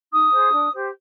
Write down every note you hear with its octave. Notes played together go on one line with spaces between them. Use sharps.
D#4 D#6
G#4 C5
D4
G4 C5